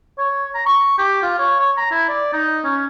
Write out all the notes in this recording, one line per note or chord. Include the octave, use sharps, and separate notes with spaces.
C#5
A#5
C#6
G4
F4
C#5
C#5
A#5
E4
D5
D#4
C#4